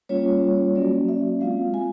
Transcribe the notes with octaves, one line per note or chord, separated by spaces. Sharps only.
G3 A#3 C#4 F4 C#5
F#3 A#3 C#4 F#4 D5
E5
G#3 C4 F4 F5
G#5